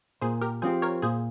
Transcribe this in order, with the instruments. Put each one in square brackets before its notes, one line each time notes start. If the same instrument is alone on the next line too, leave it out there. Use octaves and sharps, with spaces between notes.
[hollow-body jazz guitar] A#2 [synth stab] G#4 C5
[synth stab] G4 A#4
[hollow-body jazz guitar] F3 C4 G4 [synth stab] G#4 C5
[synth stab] A#4 C#5
[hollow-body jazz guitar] A#2 [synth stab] G#4 C5